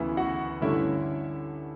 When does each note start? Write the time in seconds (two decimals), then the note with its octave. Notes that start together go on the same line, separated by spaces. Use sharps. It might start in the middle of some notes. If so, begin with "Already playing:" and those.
Already playing: D2 C#3 E3 B3 E4 E5
0.17 F#4 F#5
0.61 G2 D3 A3 C#4 E4 E5